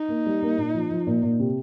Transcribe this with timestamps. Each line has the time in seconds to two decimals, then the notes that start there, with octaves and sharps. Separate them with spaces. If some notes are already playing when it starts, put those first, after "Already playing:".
Already playing: D#4
0.09 A#3
0.26 G3
0.42 A#3
0.58 A#2
0.74 F3
0.91 F3
1.07 A#2
1.23 A#2
1.39 C3